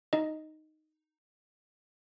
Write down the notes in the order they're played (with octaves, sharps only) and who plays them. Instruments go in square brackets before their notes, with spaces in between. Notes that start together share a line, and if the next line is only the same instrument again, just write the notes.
[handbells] D#4 D#5